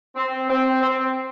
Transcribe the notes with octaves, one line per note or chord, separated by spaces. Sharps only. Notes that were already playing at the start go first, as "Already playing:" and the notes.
C4
C4
C4